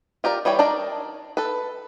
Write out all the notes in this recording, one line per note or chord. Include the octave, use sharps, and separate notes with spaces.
F4 G4 A#4 D5
E3 G3 C#5 G5
D4 D#4 A#4 D5
A4 B4